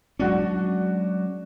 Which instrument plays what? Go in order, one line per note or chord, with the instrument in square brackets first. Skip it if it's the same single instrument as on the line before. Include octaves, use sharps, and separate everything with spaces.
[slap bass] F#3 G#3 C#4 [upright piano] D4 F#4